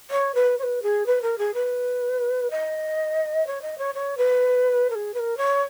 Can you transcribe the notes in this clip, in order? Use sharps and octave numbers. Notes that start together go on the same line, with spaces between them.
C#5
B4
C#5
B4
G#4
B4
A#4
G#4
B4
D#5
C#5
D#5
C#5
C#5
B4
A#4
G#4
B4
A#4
C#5